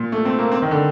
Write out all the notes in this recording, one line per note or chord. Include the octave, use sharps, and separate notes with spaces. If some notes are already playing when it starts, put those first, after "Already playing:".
Already playing: A#2
A3
C4
A#3
C4
D#3
D3